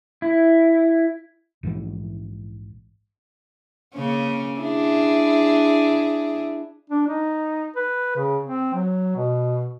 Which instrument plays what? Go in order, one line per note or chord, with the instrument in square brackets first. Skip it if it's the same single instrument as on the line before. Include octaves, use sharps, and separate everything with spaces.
[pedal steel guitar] E4
[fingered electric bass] A#1 G#2 B2 E3
[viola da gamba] C#3 A#3 C#4
D4 E4 G#4
[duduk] D4
D#4
B4
C#3
C4
F#3
B2